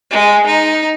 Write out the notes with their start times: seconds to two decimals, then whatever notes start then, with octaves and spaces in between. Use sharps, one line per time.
0.11 G#3
0.47 D#4